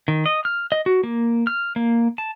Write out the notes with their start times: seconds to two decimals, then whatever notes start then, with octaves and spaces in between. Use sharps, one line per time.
0.08 D#3
0.26 D#5
0.45 F6
0.72 D#5
0.86 F#4
1.04 A#3
1.47 F6
1.76 A#3
2.18 A5